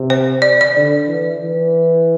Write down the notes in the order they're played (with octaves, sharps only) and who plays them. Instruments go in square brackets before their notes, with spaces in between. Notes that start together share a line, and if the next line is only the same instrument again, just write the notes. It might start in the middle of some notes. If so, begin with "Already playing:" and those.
Already playing: [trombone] C3
[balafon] C5
D5
D5
[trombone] D3
E3
E3